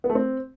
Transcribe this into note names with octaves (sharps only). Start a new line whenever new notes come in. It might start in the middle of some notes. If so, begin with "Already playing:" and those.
B3
A3
C4